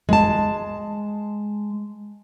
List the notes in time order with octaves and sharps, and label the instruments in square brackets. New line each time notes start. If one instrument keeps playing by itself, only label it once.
[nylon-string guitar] G#3 A5